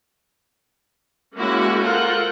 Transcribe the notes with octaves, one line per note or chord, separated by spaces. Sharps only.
G#3 A#3 C#4 E4 F#4 G4
F4 A4 A#4 C5 F#5